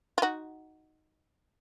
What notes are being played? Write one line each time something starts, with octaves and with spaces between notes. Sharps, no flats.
F4
D#4 F#4